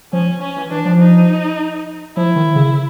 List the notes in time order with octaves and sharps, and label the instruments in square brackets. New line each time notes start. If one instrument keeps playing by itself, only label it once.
[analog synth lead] F3 [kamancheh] C#4
[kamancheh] C#4
[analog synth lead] E3
[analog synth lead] E3 [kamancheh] D4
[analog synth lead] F3
[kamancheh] D#4
[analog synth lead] F3 [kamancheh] E4
[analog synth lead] D#3
C#3